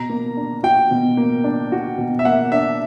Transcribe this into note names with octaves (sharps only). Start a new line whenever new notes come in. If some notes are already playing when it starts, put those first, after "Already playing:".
Already playing: B2 A#5
A#3
D4
F#4 G5
B2
A#3
D4
F#4
B2
E5
A#3 F#5
D4 E5